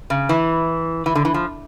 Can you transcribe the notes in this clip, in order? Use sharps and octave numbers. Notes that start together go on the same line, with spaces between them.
C#3
E3
E3
D3
E3
F3